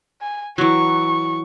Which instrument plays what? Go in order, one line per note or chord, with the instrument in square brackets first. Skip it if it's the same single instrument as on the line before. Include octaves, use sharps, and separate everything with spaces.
[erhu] G#5
[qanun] E3 F#3 [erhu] C#6